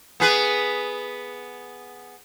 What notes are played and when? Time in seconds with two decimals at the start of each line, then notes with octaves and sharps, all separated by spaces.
0.20 B3 G#4 B4